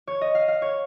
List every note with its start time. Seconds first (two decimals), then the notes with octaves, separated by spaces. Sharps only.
0.07 C#5
0.21 D#5
0.35 F5
0.48 F5
0.62 C#5